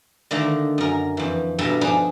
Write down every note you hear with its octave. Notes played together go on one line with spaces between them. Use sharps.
D3 D#3 A3 A#3
F#2 A#4
F2 E3
G2 B2 A4 E5 A#5
F3 D4 D#4 G#4 B4